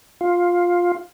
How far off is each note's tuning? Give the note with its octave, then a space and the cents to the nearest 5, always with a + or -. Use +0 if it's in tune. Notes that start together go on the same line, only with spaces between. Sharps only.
F4 +10